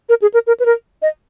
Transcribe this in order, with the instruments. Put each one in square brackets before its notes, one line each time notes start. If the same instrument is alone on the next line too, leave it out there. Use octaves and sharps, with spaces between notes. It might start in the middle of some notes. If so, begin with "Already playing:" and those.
[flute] A#4
G#4
A#4
A#4
B4
A#4
D#5